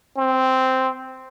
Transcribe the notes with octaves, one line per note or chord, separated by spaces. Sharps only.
C4